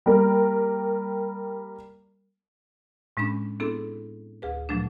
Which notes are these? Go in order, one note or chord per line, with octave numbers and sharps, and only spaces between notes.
G3 A#3 A#4
A2 G#3 C#4 D4 B5
B3 C4 D4 E4 G#4 A4
D2 G#4 B4
A#2 F3 F#3 A3 D4